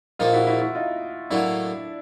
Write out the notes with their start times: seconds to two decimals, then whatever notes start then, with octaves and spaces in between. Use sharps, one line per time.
0.19 A#1 A#2 F3 A#3 D#4 F4
0.33 E4 F#4
0.47 E4 F#4
0.61 E4 F#4
0.75 D#4 F4
1.30 A2 F#3 A#3 D4 E4